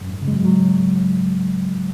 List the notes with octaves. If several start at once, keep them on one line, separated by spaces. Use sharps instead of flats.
F#2
G#2
C#3
G#3
F#3
F#3